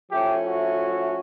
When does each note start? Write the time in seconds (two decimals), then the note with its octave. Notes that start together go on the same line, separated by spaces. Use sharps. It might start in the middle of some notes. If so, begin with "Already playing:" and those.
0.12 F3 A3 C#4 E4 G4
0.47 F#4